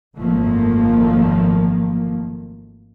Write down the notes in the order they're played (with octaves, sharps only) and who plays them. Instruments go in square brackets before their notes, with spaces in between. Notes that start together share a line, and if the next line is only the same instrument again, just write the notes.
[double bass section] G#1 F#2 D#3 F3 A3 A#3